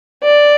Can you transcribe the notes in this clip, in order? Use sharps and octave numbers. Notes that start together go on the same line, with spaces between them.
D5